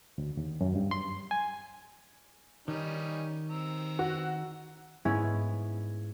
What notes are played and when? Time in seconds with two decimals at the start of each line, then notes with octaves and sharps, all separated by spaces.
0.18 D2
0.37 D#2
0.61 F#2
0.76 G2
0.91 C6
1.31 G#5
2.68 D#3 G3 C#4 D#4
3.50 C4 A#5 E6
3.99 F#4
5.05 G#2 B3 C#4 E4 G#4 G#5